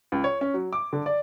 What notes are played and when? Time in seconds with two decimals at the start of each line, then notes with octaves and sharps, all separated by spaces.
0.12 C#2
0.24 C#5
0.41 C#4
0.54 F#3
0.73 D6
0.93 D3
1.06 D5